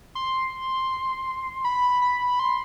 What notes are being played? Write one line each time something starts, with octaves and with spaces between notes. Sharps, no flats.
C6
B5
B5
C6